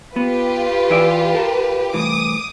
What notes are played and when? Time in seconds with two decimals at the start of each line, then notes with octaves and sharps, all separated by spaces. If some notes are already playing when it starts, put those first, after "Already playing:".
0.16 B3 F4 G4 B4
0.90 E3 E4 D5
1.34 A4 A#4
1.94 C2 A2 E3 D6 D#6